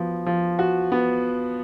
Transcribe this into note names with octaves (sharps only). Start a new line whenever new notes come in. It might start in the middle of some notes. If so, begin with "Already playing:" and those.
Already playing: F3 B3 F#4
F3
F#4
B3